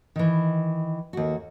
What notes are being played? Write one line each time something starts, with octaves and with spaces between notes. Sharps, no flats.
D#3 E3
D#2 F#4